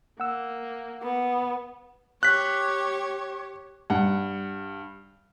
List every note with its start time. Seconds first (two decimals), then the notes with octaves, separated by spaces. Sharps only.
0.20 A#3 F#5 E6
1.03 B3
2.23 G4 C#5 F#6 B6
3.90 G2 F#5